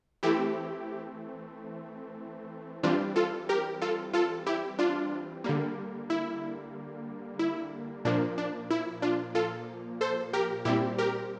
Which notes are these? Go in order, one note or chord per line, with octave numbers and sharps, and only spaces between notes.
E3 A3 C4 E4 G4
E3 G3 C4 D4 F4
F4 A4
G4 A#4
F4 A4
F4 A4
E4 G4
D4 F4
D3 G3 A#3
E4
E4
A#2 F3 A#3 D4
D4
E4
D4 F4
F4 A4
A4 C5
G4 A#4
A#2 G3 C4 E4 G4
G4 A#4